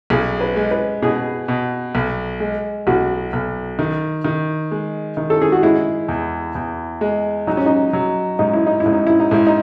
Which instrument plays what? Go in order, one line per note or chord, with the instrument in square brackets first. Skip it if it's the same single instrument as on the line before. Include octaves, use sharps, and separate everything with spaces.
[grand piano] B1 [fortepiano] G#4
[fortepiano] B4
[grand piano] G#3
[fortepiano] B4
[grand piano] B2 [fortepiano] G#4
[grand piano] B2
B1
G#3
[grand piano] B1 [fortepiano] F#4
[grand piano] B1
D#3
D#3
G#3
D#3
[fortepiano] A4
G#4
F#4
[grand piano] G#3 [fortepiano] E4
[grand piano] E2
E2
G#3
[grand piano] F#3 [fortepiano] D#4
[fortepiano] C#4
D#4
[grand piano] F#3
[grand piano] G#2 [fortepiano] D#4
[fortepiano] E4
D#4
E4
[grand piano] G#2
[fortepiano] D#4
E4
D#4
[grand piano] G#2 [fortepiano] E4
[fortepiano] D#4